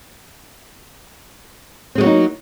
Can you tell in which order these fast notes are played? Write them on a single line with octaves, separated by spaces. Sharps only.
C4 G#3 F#3 A#3 D#4